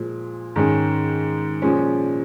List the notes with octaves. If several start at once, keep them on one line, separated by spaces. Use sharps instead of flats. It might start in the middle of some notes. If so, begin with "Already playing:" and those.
Already playing: A#2 F3 G#3
G#2 D#3 G#3 C#4
A#2 F3 G#3 C#4